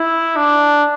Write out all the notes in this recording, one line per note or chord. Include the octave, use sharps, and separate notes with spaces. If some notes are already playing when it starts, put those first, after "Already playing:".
Already playing: E4
D4